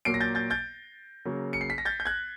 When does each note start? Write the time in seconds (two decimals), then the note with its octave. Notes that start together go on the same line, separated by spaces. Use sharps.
0.05 A#2 F#3 A#3 C7 D7
0.14 A#6
0.21 G6 A6
0.35 G6 A6
0.50 G6 A6
1.25 C#3 F#3 A#3
1.53 C#7
1.61 C7
1.70 B6
1.78 A#6
1.85 G6 A6
2.00 G6
2.05 F#6 G#6